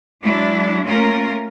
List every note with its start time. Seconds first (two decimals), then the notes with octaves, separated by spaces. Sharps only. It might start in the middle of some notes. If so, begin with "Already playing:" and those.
0.22 F#3 G#3 D4 E4
0.85 A3 A#3 C#4 F4 A#4